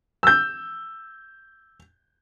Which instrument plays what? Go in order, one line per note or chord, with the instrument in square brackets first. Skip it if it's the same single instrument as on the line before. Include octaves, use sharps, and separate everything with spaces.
[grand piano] E6 G6